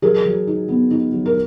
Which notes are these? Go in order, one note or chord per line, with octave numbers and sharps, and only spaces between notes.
F#3 G#4 A#4
F#3
D#4
B3
D#4
F#3
A#4